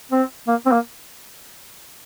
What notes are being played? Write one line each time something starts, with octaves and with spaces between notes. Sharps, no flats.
C4
A#3
C4
A#3